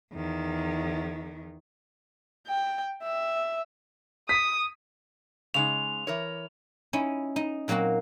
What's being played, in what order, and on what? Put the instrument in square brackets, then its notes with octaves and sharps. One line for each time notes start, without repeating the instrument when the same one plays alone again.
[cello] E2 D#3
[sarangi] G5
E5
[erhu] D#6 [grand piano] B6
[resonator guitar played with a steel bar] C#3 G#3 D#4 [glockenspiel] F7
[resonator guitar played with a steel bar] E3 A#4 C#5
[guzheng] C#4 D#4 E4
D#4
A#2 F#3 A#3 C4 F#4